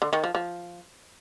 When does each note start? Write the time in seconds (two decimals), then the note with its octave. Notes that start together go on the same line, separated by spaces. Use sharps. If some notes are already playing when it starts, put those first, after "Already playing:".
0.02 D3
0.13 D#3
0.24 F3
0.35 F3